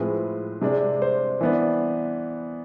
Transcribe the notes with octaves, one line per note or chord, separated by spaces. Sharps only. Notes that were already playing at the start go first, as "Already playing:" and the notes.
Already playing: A2 F3 G#3 C4 B4
C3 G#3 D4
C5
E3 B3 D4